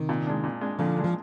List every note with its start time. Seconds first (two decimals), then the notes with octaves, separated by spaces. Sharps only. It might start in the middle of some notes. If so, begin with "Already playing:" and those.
Already playing: C3 D#3
0.09 A#2
0.27 G#3 D4
0.44 A#2
0.61 G#3 D4
0.79 A#2 D3 F3
0.96 G#3 D4
1.04 F3